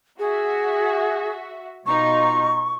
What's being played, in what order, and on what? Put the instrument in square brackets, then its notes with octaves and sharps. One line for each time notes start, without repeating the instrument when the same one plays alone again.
[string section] F#4 E5 [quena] G#4
[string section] B2 D#4 F4 [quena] C#6